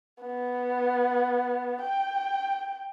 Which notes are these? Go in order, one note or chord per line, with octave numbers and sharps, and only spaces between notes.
B3
G5